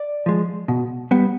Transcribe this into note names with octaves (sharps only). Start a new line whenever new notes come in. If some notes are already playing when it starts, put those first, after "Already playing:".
Already playing: D5
F3 G#3
B2
G3 B3